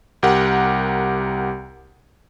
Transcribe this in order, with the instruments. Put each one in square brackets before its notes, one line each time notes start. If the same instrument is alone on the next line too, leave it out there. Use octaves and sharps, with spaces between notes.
[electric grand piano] C2 G4 A#4 F#5